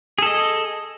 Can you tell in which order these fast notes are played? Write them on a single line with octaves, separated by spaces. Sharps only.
G#4 A4 D#5